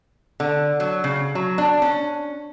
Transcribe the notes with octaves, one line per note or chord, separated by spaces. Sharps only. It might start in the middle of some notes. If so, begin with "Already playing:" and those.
D3
F#3
C#3
F#3
D4
C#4